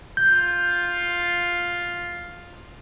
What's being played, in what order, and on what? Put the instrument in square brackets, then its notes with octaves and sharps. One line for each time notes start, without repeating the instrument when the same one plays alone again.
[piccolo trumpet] F4 [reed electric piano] G6